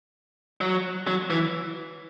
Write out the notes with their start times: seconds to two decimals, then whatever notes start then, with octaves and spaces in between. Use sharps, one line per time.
0.61 F#3
1.07 F#3
1.30 E3